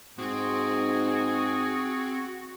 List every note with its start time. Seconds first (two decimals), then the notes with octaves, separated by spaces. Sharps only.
0.19 G#2 C4 F#4 G#4